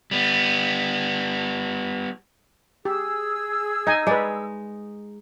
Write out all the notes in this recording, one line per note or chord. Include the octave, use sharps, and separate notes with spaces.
G3 B3
G4 G#4 E6
D#4 D#5 G#5
G#3 B4 D5